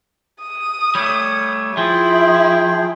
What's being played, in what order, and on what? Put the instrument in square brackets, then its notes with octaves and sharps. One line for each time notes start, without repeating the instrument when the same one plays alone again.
[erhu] D#6
[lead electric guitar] G3 A3 [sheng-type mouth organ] C#5
[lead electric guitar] F3 [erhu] E4 [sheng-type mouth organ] G#4 G5